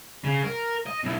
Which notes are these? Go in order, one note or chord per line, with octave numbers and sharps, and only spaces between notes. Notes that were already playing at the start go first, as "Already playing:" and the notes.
C#3
A#4
D#5
B1 E4